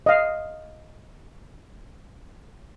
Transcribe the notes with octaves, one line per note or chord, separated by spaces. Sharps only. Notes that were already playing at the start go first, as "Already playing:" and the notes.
D#5 F5